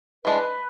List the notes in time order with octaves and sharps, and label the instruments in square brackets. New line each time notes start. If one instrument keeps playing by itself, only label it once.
[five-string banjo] E3 G#3 D4 [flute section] B4